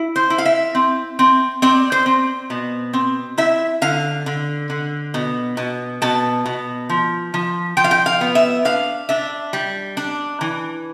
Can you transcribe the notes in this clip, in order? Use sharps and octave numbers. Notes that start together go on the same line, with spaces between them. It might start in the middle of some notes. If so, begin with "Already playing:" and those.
Already playing: E4
C5
E4
F5
E5
C4
C4
C4 D5
C5
C4
B2
C4
E4 E5
D3 F5
D3
D3
B2
B2
B2 A5
B2
F3
F3
F3 G5
F5
G5
F5
B3
E5
D4 F5
D4 E5
G3
D4
E3